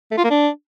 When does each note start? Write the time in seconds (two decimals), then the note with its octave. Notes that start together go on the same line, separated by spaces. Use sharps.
0.11 A3
0.18 F4
0.24 A#3
0.30 D4